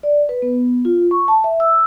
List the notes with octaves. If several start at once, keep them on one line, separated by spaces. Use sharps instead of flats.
D5
B4
B3
F4
C#6
A5
E5
E6